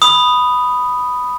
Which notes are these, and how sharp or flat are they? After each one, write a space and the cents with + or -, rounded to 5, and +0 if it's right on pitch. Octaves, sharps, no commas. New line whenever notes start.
B5 +0 D#6 -5